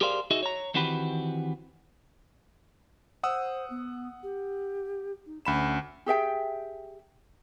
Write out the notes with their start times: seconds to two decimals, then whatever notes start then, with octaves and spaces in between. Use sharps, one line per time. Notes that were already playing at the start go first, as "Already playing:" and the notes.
0.01 G4 G#4 A#4 C5 D5 F5
0.31 D#4 F#4 G#4 D#5 E5
0.43 C#5 A#5
0.74 D#3 E3 C4 F#4 G4 B4
3.23 C5 F#5 D#6 E6
3.70 B3
4.23 G4
5.26 D#4
5.45 D2 C#4 B5 E7
6.06 G4 G#4 E5 G5